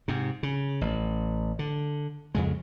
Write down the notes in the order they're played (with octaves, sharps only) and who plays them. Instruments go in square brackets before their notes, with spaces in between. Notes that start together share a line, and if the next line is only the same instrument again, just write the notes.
[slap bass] G#2 C3
C#3
A1
D3
F2 C#3 G#3